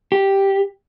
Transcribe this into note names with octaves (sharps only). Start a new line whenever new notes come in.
G4